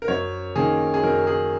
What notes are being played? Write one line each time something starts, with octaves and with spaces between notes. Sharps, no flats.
A#4
F#2 C#5
D#3 A#3 C#4 G#4
G#4
F#2 A#4
G#4